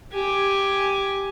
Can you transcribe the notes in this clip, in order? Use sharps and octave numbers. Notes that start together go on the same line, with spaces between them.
G4 G#5